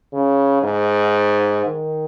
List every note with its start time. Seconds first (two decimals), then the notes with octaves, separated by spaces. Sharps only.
0.13 C#3
0.63 G#2
1.66 D#3